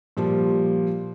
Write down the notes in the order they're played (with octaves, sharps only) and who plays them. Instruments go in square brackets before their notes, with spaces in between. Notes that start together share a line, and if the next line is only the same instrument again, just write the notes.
[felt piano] A#2 F3 G3